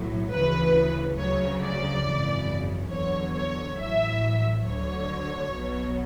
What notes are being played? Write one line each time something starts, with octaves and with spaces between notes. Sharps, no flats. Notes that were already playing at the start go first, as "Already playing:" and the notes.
Already playing: B1 A2 F#3
D2 C#3 E3 B4
D2 C#3 F#3 C#5
D5
G#1 F#2 C#3 E3
E2 D3 F#3 C#5
C#5
A1 A2 F#3 E5
D2 D3 F#3 C#5
B1 B2 F#3